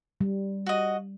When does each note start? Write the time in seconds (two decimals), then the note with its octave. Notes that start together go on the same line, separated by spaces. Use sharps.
0.21 G3
0.66 F#4 D#5